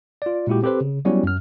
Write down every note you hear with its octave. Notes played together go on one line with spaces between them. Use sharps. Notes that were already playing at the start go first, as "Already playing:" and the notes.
F4 D5
A#2 G#3 E4 F#4 G4
C4 G4 A4 B4 C5
C#3
F#3 G3 B3 C#4 E4 F#4
F#2 F6